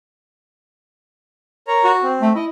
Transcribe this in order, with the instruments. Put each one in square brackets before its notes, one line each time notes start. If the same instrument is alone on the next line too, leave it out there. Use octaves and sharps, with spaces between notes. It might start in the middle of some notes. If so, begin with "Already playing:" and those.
[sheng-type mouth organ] A#4 C#5 A#5
[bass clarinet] F#4
[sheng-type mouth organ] C4
[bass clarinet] A3
[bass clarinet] E4 [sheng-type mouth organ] D#5